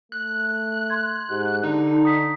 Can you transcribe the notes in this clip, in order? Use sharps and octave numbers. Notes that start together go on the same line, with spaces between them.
A3 F#6
C6 G#6
G#2 G4 G#4
D3 D#4
A#5 D#6 B6